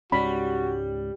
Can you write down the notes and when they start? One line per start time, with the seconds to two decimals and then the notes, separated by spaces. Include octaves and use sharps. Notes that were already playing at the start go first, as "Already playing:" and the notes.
0.12 C#2 G#2 G3 C#4 F#4 B5